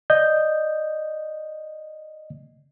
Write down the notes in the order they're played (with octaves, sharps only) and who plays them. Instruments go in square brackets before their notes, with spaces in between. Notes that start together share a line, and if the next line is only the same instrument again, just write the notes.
[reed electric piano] D5 D#5 G6